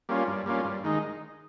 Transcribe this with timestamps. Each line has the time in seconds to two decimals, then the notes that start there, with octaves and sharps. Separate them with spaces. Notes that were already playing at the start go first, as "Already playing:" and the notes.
0.09 G3 A#3 C#4 F4
0.27 G2
0.46 G3 A#3 C#4 F4
0.64 G2
0.84 D#3 G#3 D#4